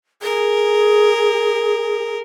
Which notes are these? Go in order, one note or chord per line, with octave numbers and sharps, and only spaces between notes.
G#4 A#4